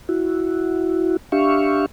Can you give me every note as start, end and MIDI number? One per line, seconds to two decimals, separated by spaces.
0.09 1.17 64
0.09 1.17 66
1.32 1.86 62
1.32 1.86 67
1.32 1.86 76
1.32 1.86 77
1.32 1.86 85